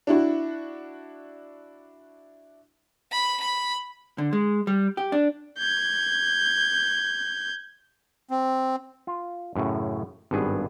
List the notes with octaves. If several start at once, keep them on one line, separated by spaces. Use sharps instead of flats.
D4 E4 F#4
B5
B5
D3
G#3
G3
G4
D4
G6 G#6
C4
F4
F#2 A2 C#3
G#1 G2 B3 G#4